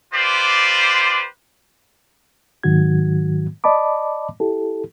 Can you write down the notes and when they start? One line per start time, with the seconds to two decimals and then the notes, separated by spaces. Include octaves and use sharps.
0.13 F4 G4 B4 C5 D5
2.63 G#2 D#3 F#3 F#4 G#6
3.64 D5 D#5 A5 B5 D6
4.40 E4 G4 A4